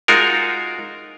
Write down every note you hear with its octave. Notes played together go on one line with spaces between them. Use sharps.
G#3 D#4 F4 F#4 A#4